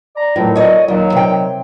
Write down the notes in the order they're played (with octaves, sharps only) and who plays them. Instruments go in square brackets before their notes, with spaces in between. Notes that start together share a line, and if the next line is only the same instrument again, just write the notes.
[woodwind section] D5 A#5
[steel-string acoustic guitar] A2 [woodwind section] D#3 F3 F#3
[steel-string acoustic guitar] C#5 D#5
[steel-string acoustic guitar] D#2 [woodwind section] D#3 F#3
[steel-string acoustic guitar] C3 G5